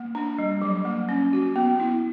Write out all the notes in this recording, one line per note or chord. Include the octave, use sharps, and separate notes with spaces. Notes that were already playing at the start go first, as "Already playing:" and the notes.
Already playing: A#3
D4
G3
F#3
A#3
C#4
F#4
B3
E4